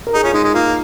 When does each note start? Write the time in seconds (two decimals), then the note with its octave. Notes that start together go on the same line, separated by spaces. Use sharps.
0.07 A#4
0.13 D#4 G#4
0.23 C#4 F4
0.34 G#3 D#4
0.44 G#3
0.54 A#3 F4